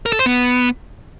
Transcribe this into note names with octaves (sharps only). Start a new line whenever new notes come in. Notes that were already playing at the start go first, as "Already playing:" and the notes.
A#4
A4
C5
B3